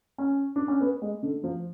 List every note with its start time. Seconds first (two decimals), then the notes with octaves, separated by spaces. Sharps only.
0.18 C#4
0.56 D4
0.68 C#4
0.81 B3
1.02 G#3
1.23 D3
1.44 F3